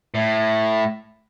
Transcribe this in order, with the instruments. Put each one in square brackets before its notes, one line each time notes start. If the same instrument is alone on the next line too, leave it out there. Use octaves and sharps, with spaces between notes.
[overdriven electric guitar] A2